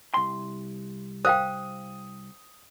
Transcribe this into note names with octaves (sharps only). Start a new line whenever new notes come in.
C2 C6
C5 F5 G5 D#6